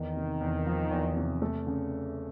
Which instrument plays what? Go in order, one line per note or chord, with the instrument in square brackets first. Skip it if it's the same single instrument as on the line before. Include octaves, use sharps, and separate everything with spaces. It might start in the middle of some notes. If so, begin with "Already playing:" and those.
Already playing: [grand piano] E2 [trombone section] D#3
[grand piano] C3
E2
F3
E2
C3
A3
C#3